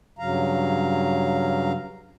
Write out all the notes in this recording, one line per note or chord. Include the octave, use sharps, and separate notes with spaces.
G2 C#3 F#3 F5 A#5